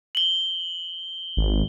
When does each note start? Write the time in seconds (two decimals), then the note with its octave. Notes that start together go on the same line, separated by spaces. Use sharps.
0.15 F#7 G7
1.37 G#1